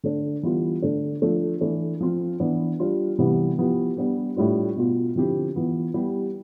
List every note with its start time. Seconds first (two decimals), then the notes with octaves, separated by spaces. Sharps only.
0.04 D3 A3 D4
0.43 E3 G3 B3 F4
0.82 D3 A3 D4
1.22 F3 A3 D4
1.61 E3 A3 D4
2.01 F3 C4 F4
2.40 E3 B3 D4
2.80 G3 D4 F4
3.19 C3 E3 G3 B3 E4
3.58 F3 B3 E4 G4
3.97 G3 B3 D4 G4
4.36 A2 G3 D4 F4
4.76 B2 B3 F4
5.16 D3 F3 C4 E4 G4
5.55 E3 B3 F4
5.94 G3 B3 E4 G4